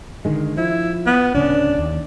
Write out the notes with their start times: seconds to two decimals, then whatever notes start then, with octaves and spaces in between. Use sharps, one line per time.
0.25 D3 D#3 G#3
0.57 F3 E4
1.07 B3
1.35 D1 C#3 C#4 D4
1.78 D#2